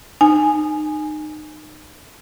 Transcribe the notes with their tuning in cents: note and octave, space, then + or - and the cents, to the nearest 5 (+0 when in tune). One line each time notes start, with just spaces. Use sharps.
D#4 -25 G#5 +0